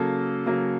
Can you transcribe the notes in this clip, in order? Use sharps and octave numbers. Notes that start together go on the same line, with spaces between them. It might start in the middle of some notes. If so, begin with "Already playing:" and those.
Already playing: C#3 F#3 A#3 A4
C#3 F#3 A#3